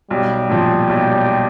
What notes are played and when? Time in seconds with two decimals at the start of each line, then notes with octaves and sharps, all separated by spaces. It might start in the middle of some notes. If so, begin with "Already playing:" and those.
0.10 B1 G3
0.50 A#2 F3
0.89 B1